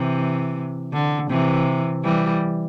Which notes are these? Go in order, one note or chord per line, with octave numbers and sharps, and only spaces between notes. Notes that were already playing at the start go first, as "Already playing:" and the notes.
Already playing: C3 E3
D3
C3 E3
E3 G3